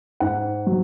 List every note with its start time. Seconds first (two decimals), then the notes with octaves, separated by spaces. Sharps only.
0.20 G#2 F#5
0.66 F#3